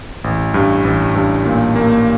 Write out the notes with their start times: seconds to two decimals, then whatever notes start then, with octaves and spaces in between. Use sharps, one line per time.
0.24 A1
0.54 G2
0.84 A1
1.15 G2
1.45 A#2
1.76 A#3